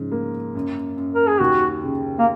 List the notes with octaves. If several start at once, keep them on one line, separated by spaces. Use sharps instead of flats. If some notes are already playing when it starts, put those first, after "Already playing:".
Already playing: G#2 C#3 F3
A#3
F#2
F#2
A#4
G#4
D#2 F#4
C#3
A#3